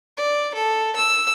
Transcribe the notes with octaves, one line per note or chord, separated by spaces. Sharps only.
D5
A4
E6